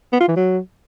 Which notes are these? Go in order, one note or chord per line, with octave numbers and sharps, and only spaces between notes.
B3
F4
E3
F#3